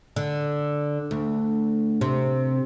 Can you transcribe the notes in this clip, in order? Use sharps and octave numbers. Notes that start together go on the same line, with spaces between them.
D3
D2
C3